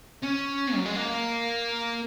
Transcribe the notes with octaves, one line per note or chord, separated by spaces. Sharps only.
C#4
F#3
G#3
A#3